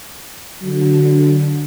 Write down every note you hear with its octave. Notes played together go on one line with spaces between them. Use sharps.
D3 F#3